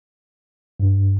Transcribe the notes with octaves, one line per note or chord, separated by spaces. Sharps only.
G2